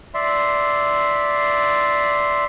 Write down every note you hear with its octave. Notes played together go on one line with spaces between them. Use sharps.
D5 E5 C6